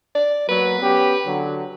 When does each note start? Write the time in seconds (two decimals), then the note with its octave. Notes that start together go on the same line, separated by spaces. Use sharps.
0.15 D5
0.48 F#3 A#3 B3 B4
0.81 B3 C#4 G4
1.25 D3 F#3